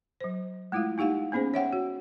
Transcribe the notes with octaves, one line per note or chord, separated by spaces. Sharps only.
F#3 C5
G#3 A3 E4 F4 F5
A#3 D#4 G4 F5 F#5
A#3 B3 C#4 G#4 C5
C#5 E5 F#5 G5
F#4